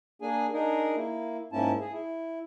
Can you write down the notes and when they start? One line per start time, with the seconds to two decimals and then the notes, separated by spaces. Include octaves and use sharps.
0.22 A#3 D4 G#4 G#5
0.53 D4 D#4 G#4 A#4
0.96 A#3 E4
1.52 G#2 A#3 C#4 E4 A5
1.81 G#4
1.93 E4